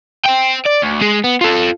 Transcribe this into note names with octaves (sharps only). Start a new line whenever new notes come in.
C5 G5
D5
D2
G#3 G#4
B3
F4 A4